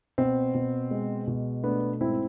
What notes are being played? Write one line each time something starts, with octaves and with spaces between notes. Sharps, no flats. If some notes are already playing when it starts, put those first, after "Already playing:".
B2 C4
B2
G#3
B2
A3 B3 D4
G#2 C4 E4